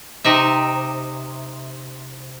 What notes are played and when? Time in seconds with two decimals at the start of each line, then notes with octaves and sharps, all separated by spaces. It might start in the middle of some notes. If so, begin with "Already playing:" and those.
0.24 C3 D#4 E5